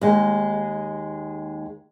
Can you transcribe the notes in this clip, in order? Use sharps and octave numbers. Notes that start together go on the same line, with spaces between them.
D#2 G#3